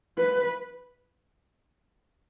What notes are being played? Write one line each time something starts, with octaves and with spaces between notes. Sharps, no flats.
B4